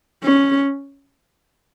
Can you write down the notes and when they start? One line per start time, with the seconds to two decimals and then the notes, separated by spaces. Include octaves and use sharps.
0.23 C#4